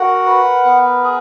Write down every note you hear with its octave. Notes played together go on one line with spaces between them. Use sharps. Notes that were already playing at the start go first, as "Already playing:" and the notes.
Already playing: F#4 A#4 F#5
B4
B3
G#4